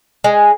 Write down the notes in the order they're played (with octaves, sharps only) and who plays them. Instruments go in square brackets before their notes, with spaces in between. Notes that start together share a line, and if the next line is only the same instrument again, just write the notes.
[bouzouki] G#3